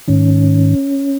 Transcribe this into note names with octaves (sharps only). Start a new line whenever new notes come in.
G#2 D#3 C#4